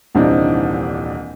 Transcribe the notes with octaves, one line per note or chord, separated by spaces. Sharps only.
D#1 C2 E3 C4 D4 D#4